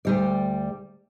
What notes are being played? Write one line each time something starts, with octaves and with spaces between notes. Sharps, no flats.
D2 G3 D5